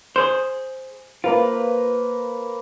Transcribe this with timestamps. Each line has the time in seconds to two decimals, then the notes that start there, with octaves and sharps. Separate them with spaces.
0.16 G#4 C5
1.24 A#3 F4 B4 C5